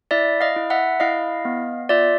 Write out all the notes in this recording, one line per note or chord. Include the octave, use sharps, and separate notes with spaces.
E4 D5 E5
D#5 F5
E4
E5 F#5
E4 D#5 F5
B3
F4 D5 E5